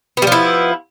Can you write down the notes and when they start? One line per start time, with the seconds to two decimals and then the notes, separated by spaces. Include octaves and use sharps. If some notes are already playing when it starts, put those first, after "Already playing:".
0.17 B3
0.22 G3
0.27 F3
0.32 E4